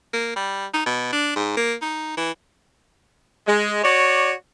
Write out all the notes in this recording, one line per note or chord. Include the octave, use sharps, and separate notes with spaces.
A#3
G3
D#4
B2
D4
G#2
A#3
D#4
E3
G#3
F#4 C#5 D5